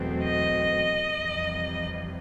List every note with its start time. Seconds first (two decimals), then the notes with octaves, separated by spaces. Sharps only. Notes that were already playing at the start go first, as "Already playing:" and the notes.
Already playing: E2 B2 F#3 A3 C4
0.23 D#5
1.12 F2 C3 E3 G3